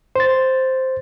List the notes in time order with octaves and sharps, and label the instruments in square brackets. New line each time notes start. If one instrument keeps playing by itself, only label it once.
[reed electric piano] C5 A6